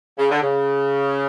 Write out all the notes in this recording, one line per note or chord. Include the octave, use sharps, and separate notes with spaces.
C#3
D3
C#3